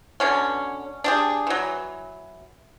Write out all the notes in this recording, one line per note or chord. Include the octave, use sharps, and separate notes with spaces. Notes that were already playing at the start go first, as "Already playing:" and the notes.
B2 D3 C#4
D4 G4 G#4
E3 F#3